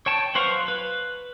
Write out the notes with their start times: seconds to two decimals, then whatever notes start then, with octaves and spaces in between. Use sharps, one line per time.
0.06 C#5 G5 A5
0.35 F#3 B4 C5 F5 C#6
0.68 B4